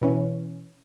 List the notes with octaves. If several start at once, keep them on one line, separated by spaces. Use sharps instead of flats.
B2 E3 C#4